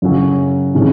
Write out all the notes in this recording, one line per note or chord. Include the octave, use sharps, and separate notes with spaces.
F#2 C#3 F#3 C#4
C3 D#3 G#3 C#4